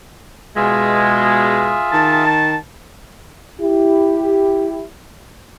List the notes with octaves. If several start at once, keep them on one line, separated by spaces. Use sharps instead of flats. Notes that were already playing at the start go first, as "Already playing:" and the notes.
B2 G#3 F4 G#4 E5
D#3 A5
E4 G4